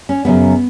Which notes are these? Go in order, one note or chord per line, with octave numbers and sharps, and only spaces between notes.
C#4
F#2 C#3 F#3 B3